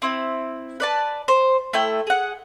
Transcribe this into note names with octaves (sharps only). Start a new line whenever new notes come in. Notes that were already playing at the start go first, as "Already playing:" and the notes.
C4 E4
B4 D5 A5
C5
A3 E4 G5
G#4 F#5